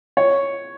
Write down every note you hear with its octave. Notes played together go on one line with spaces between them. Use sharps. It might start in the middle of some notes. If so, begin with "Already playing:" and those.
C#5